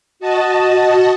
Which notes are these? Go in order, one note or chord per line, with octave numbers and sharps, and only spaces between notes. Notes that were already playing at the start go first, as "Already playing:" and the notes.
F#4 D#5 A5